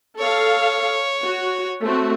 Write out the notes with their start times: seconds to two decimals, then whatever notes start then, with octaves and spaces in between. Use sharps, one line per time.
0.18 A4 C#5 F5
1.22 F#4
1.82 A3 C4 F#4